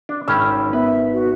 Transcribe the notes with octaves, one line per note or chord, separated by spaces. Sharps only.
D4
G#1 C#4 G5 B5 E6
B3 B4 E5
F#4